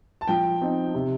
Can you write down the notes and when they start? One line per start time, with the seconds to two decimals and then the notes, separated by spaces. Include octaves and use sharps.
0.21 A5
0.28 F3 G5
0.61 C4 D#4
0.94 C3